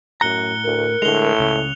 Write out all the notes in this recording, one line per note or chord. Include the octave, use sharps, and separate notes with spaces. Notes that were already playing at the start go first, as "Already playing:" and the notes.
F#2 A2 A#5 F#6 C#7 G7
D2 A#4
A2 D3 G#3 F7 G7
C#2 C#3